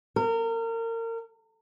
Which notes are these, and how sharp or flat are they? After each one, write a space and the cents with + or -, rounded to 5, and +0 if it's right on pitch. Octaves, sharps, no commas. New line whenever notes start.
A#4 -30